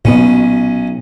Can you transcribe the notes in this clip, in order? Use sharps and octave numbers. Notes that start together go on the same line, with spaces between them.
B1 A#2 B3 C#4